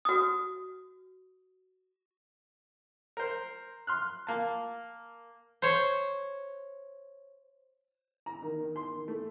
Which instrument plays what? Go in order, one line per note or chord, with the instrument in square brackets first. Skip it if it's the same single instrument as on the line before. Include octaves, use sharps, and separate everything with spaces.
[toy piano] F#4 D#6
[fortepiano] A#4 C5
C6 F6 F#6
A#3 A5
[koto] C5 C#5
[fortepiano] A#5
D#3
D#3
C6
D#3
A3